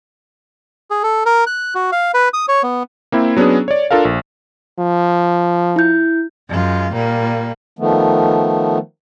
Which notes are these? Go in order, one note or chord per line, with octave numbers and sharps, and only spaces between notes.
G#4
A4
A#4
F#6
F#4
F5
B4
D#6
C#5
B3
A#3 C4 E4
F#3 B3 C#4 D4 G#4
C#5 D5
D4 F4 A4 A#4 F5
A#1
F3
E4 G6
F#2 G#3 F4
A#2 G3 A#3
D#3 F3 A3 B3